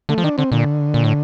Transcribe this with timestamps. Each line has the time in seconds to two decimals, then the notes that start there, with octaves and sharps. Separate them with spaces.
0.09 D3 A3
0.18 F3
0.24 D#3 D4
0.38 D3 C4
0.52 A#2 D3
0.94 A#2
1.04 A2